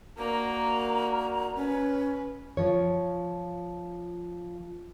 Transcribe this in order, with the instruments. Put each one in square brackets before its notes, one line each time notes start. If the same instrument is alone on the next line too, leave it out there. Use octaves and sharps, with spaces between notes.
[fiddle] A#3 [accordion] D4 F#4 A#4 [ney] A#5
[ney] C#4 [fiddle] B4
[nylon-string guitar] F3 C#5